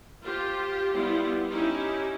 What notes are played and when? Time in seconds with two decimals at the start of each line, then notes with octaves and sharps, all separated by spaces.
0.22 F4 G4 C5
0.93 G3 B3 E4 F4
1.50 C#4 D#4 E4 G4